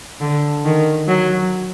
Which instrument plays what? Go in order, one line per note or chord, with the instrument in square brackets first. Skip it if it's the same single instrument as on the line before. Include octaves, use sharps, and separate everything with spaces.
[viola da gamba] D3
D#3
F#3